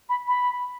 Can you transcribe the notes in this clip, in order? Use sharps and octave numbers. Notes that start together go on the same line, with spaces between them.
B5
B5